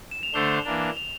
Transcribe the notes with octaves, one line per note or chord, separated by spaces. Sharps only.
E7
F7
D3 A3 D4 A4 C5 G7
E3 A#3 D4
F7